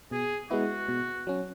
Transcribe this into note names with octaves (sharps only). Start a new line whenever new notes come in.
B2 G#4
G#3 B3 E4 F#4
B2
F#3 C#4